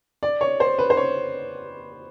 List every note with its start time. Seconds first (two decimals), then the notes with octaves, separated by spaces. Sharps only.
0.23 D5
0.41 C#5
0.60 C5
0.79 B4
0.90 C5
0.97 C#5